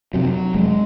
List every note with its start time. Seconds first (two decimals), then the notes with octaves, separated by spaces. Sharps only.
0.14 F2 C3 F#3
0.54 F1 G#3